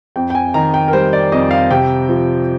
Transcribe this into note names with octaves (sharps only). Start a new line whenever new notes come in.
F2 G5
G5
G#5
D#3 A#5
G5
A#4
G3 C5
D5
F2 D#5
F5
C3 G5
F3